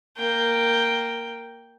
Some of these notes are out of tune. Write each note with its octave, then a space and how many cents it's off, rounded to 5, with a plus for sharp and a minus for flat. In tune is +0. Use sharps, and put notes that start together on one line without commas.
A#3 -5 G5 +0